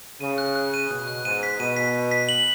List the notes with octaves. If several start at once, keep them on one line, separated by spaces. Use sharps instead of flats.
C#3 D#7
F#6
F#6
D#7
B2 F#6
F#6
G#2 D#7
B6
B2 D#7
B6
B6
B6
F#7